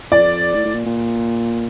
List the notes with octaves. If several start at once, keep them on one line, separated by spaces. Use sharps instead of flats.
F2 D5
A2
A2
A#2
A#2